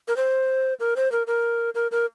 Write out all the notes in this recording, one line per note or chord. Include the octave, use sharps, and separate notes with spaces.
A#4
C5
A#4
C5
A#4
A#4
A#4
A#4